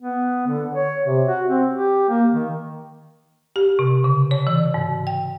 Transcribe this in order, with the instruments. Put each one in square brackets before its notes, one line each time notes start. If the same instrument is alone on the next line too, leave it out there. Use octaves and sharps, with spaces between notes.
[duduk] B3
D3
C#5
C3
F#4
C4
G4
A#3
D#3
[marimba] G4
C3
C#3
C#5
E3
G#2
G5